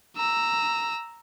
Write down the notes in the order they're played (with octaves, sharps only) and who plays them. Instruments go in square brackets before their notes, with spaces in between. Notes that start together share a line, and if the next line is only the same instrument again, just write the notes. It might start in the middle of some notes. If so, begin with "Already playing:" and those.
[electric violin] A#5 E6